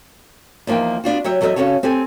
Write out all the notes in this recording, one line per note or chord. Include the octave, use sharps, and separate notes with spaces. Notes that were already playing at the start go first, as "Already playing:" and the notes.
E2 F3 A#3 D#4 G5
B3 D4 F4 F#4
F#3 G4 C#5 E5
E2 F#3 A4 A#4 D#5 E5
C#3 C#4 D4 F#4 A4 C#5
C4 G4 A4 G#5